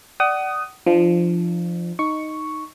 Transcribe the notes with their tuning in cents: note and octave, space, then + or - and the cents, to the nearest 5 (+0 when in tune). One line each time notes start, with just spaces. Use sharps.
D5 +5 F#5 +30 D#6 +0
F3 -10 D4 +30
D#4 +0 C#6 +0